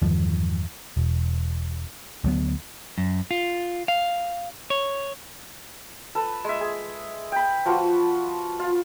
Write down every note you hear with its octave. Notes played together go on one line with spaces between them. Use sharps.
E2 G2 D#3 F3
E1
D2 F#3 B3
F#2
F4
F5
C#5
A4 B4
G#3 E5
G#4
G5 B5
F3 F4 F#4 B4
F4